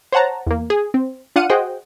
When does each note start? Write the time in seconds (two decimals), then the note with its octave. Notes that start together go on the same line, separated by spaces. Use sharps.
0.12 C5 C#5 F#5 A5 A#5
0.47 E2 A#3
0.70 G#4
0.94 C4
1.36 D4 F4 F5 F#5 C#7 D#7
1.50 F#4 G#4 C5 D#5 F#5 G5